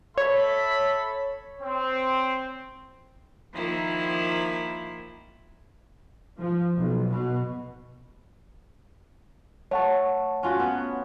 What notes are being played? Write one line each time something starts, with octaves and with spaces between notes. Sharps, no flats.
A4 C#5 E5 B5
C4
D#3 F3 A#3 E4
F3
B1
B2
A3 C#5 F#5 A5
C#4 F4 F#4
B3